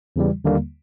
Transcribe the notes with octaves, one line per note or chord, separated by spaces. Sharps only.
E2 C#3 E3 G3
D#2 D3 G3 A#3